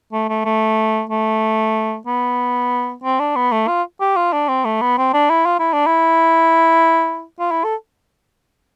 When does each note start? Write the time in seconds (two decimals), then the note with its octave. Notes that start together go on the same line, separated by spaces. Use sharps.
0.13 A3
0.29 A3
0.45 A3
1.10 A3
2.07 B3
3.04 C4
3.20 D4
3.36 B3
3.52 A3
3.68 F4
4.01 G4
4.16 F4
4.33 D4
4.48 C4
4.64 A3
4.81 B3
4.98 C4
5.13 D4
5.30 E4
5.46 F4
5.59 E4
5.73 D4
5.87 E4
7.40 F4
7.52 E4
7.64 A4